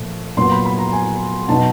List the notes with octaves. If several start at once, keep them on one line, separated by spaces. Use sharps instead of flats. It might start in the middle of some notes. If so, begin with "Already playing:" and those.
Already playing: A#2 F3 A3
A#2 F#3 B3 C6
B5
B5
A#5
G#5
B2 F#3 B3 D#4 A5